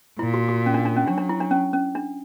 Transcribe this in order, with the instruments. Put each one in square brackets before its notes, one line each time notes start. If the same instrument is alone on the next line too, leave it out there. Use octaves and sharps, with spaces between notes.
[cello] A#2 [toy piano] E4
[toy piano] F#4
F#4
C#4
D4
D4
C#4
[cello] F#3 [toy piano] D4
[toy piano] D4
E4
D4
C#4
C#4
D4